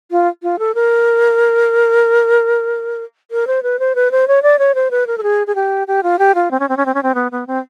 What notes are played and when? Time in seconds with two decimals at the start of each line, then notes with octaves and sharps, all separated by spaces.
0.11 F4
0.43 F4
0.59 A4
0.75 A#4
3.31 A#4
3.47 C5
3.63 B4
3.79 C5
3.95 B4
4.11 C5
4.28 C#5
4.43 D5
4.59 C#5
4.75 C5
4.91 B4
5.07 A#4
5.18 A4
5.23 G#4
5.47 G#4
5.55 G4
5.87 G4
6.03 F4
6.19 G4
6.35 F4
6.51 C4
6.60 C#4
6.69 C4
6.77 C#4
6.86 C4
6.94 C#4
7.03 C4
7.15 B3
7.32 B3
7.47 C4